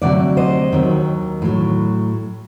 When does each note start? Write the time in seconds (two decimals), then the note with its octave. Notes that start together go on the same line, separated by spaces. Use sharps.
0.02 D2 C3 F#3 D5 F#5
0.37 C5 D#5
0.72 D#2 D#3 F#3
1.42 A2 F#3